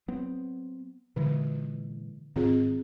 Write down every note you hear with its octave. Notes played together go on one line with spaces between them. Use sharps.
F#3 B3 C4
A#2 D3 E3 G#3
G#2 D#3 C4 F4 G#4